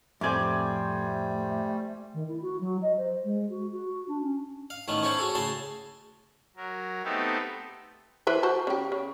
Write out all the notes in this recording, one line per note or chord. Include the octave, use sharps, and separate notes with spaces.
F2 A2 G3 A3 C5 D5 G#5 D6
D#3
E4
F#4
F#3
D#5
C5
G#3
F#4
F#4
D4
C#4
F5
A1 D#3 A3 B3 C#4
C#4 E4 A4 C5 C#5
F#4 G#4 A4
A2 C#3 G#4 A5 C6
F#3 A#4
A3 B3 C4 D#4 G4 A4
E3 B4 C5
F#4 C5 A5
C#3 G4
C#3